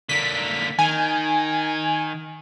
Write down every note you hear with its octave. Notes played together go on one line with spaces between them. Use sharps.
D3 A#3 B6
D#3 G#5